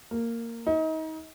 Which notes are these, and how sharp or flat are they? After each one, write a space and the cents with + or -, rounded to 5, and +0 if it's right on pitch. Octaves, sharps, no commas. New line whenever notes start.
A#3 -10
D#4 +30